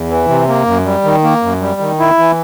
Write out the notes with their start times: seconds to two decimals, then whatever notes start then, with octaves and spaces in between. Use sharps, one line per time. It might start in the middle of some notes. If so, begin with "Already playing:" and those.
Already playing: E2
0.10 E3
0.28 C3
0.48 A#3
0.66 F#2
0.86 G3
1.04 D#3
1.24 A#3
1.42 F#2
1.61 G3
1.80 D#3
1.99 E4
2.19 E3